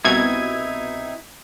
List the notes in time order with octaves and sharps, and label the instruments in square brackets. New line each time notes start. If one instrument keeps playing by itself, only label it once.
[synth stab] C2 B2 G#6 [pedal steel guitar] C4 D#4 E4